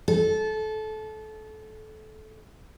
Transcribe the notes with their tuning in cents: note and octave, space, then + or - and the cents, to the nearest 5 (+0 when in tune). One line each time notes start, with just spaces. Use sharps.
A4 -25